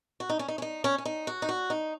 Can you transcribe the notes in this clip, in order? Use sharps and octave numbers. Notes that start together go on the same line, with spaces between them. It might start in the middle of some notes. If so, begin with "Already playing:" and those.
F#4
D#4
C#4
D#4
C#4
D#4
C#4
C#4
D#4
F#4
D#4
F#4
D#4